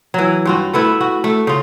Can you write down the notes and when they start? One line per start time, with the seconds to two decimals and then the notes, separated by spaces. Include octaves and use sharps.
0.14 E3 F#3
0.45 G2 F4 F#4
0.73 A3 B3 E4 B4
1.01 F#4
1.24 A3
1.47 C#3 F4